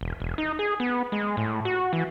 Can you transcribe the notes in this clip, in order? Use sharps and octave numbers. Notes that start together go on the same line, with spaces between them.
E1
E1
D#4
G#4
B3
G#3
A2
F#4
E3